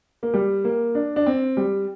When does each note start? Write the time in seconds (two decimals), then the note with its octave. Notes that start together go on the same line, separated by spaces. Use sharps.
0.23 A#3
0.34 G3
0.64 A#3
0.95 D4
1.16 D4
1.26 C4
1.57 G3